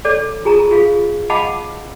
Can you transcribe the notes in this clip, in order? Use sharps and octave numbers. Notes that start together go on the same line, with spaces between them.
A4 C#5 D5
F4 G#4 A5 A#5
F4 G#4 F5
D#5 F5 F#5 A5 B5 D6